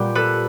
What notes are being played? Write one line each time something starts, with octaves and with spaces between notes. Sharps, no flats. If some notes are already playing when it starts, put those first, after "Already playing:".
Already playing: A#2 G3 B3 G4
A4 B4